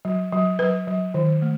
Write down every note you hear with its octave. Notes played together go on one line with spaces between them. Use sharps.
F#3
F#3
F#3 B4
F#3
D#3
A3